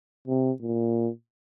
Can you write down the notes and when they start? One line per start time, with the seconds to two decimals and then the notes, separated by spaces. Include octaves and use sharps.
0.28 C3
0.61 A#2